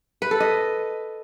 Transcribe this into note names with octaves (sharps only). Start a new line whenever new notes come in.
B4
A4
D#5